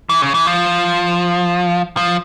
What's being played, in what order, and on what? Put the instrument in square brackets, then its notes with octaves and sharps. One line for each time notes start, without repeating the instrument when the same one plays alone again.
[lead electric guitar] E3
C#3
E3
F3
F3